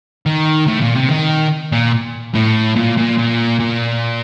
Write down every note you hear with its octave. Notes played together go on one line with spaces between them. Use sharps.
D#3
A2
A#2
C3
D#3
A#2
A2
A#2
A#2
A#2
A#2